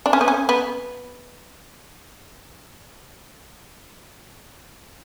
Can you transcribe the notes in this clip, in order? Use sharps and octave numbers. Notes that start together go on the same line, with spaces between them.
D4
C#4
B3
C#4
B3